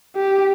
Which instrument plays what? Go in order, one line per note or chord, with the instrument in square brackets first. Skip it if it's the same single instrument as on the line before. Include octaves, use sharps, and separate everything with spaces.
[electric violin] G4